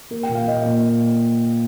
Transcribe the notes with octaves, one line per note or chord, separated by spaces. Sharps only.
A#3 A#4
G5
A#2
F5
A#3 D#5
A#2